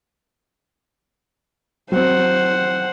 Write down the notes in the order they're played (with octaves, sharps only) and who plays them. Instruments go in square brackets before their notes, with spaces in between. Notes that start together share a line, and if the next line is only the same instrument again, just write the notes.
[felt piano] F#3 C4 [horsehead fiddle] C5 F#5